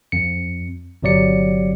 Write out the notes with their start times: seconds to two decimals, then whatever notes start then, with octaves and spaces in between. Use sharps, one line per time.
0.12 F2 C#7
1.02 G1 C3 F#3 D5 C#7